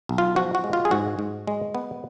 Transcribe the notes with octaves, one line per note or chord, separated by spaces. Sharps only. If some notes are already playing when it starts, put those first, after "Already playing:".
B1
F4
F3 F#4
F#4
G#3
F4
G#4
G#2 F#4
G#2
G#3
B3